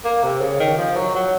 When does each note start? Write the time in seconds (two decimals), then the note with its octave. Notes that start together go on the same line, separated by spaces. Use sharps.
0.05 A#3
0.23 C3
0.41 C#3
0.60 D#3
0.77 F3
0.96 F#3
1.15 F#3